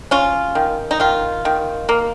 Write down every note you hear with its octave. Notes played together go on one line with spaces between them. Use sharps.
C#4 F4
D#3
D#4
D#3 F4
D#3
A#3